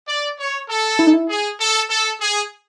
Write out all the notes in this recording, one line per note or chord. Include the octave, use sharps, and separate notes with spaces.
D5
C#5
A4
E4
D#4
E4
G#4
A4
A4
G#4